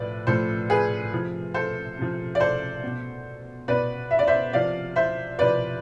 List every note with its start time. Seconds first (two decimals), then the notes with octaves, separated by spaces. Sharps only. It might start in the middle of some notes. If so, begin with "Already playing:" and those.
Already playing: A2 F3 B4 D5
0.27 A2 F3 A4 C5
0.70 G#4 B4
1.12 C3 F3
1.54 A4 C5
1.98 C3 F3
2.35 D5
2.40 A4 C5
2.83 B2
3.68 B2 B4 D5
4.11 E5
4.19 D5
4.27 C5 E5
4.53 C3 F3 D5 F5
4.96 C5 E5
5.39 C3 F3 B4 D5